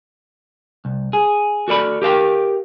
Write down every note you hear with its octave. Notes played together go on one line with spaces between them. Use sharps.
C2
G#4
F#4 A4 D5 B5
G4 A#4 F5 G5